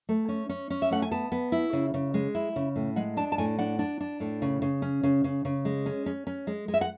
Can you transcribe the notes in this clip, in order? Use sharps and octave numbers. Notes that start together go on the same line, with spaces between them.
A3
C#4
C#4
C#4
E5
A3 F#5
G#5
B3 A5
B3
E4
C#3
C#3
G#3
E4
C#3
A2
G#3 F#5
D4 A5
A5
A2 G#5
D4 F#5
D4
D4
A2
C#3
C#3
C#4
C#3
C#3
C#3
G#3
C#4
C#4
C#4
G#3
G#3
E5
F#5